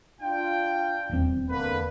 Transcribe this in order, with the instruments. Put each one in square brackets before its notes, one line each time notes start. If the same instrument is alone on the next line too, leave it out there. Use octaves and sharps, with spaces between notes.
[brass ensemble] D4 F4 G5
[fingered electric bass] D#1 E2 C4
[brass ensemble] D3 A#3 B4